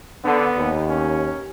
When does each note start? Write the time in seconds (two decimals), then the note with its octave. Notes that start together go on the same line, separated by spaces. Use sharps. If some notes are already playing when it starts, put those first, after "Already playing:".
0.25 D3 B3
0.57 D#2
0.89 C#4